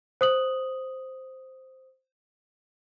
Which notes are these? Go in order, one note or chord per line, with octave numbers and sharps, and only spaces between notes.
C5 D#6 F#7